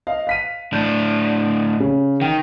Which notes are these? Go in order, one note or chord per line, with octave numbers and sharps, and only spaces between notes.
D#5 F5
F5 B6 D#7
A2 D4 G6
C#3
D#3 G5